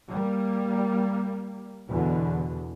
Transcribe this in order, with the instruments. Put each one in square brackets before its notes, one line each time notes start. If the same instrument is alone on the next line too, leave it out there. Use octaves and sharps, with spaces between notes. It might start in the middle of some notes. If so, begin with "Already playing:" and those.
[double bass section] G3 A#3
E2 B2 D3